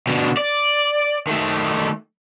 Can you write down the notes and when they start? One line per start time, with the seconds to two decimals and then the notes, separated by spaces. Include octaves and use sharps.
0.07 B2 D3
0.37 D5
1.27 D#3 A3